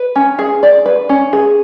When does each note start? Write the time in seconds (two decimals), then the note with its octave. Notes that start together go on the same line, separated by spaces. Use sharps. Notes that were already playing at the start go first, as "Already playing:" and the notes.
Already playing: B4
0.16 C#4
0.39 G#4
0.63 D5
0.86 B4
1.09 C#4
1.33 G#4